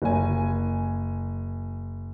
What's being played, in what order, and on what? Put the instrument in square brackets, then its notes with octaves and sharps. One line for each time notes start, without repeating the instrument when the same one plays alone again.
[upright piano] F#1 G#5